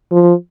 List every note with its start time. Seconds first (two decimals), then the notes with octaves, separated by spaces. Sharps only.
0.12 F3